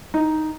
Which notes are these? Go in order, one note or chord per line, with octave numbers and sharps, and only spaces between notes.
D#4